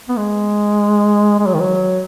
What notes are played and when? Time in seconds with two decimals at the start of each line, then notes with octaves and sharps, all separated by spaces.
0.09 B3
0.17 G#3
1.39 G#3
1.46 F#3
1.54 D#3
1.60 F#3